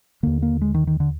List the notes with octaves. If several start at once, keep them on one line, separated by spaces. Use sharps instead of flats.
D#2 D3 A#3
A#3
G#3
D#3
D#3
D3